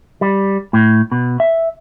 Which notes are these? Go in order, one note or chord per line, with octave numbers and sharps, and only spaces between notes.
G3
A2
B2
E5